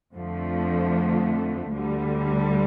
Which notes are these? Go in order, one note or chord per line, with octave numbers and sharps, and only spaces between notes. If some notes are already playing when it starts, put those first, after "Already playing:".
F2 D3 F3 A3
D2 D3 G3